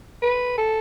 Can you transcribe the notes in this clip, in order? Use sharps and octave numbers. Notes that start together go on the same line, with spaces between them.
B4
A4